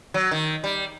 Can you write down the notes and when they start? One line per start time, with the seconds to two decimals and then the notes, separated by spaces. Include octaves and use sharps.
0.14 F#3
0.31 D#3
0.64 G3